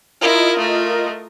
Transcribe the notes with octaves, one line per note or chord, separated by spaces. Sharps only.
E4 F4 A#4 D#5
A3